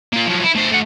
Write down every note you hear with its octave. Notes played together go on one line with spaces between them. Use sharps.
A#3 F4
F3 F#3
E4
A3 C5
A3 F#5